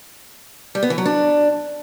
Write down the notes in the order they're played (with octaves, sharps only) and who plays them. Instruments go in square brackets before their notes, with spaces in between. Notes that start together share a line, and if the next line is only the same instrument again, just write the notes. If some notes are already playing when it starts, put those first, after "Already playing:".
[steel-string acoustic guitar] G3
B3
E3
F#3
D4